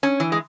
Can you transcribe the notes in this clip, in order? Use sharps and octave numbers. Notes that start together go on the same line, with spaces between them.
C#4
E3
G#3